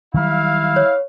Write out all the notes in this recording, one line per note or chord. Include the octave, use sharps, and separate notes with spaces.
D#3 F#3 G3 E4 F5
C#5